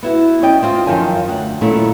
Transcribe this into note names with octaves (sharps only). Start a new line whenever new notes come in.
B3 E4 F#4
C#4 D5 D#5 G5
C4 F4 D#5
F#2 D#3 F3 G5 G#5
D2 F#5
A#2 D#3 F#3 A3 C#4 E4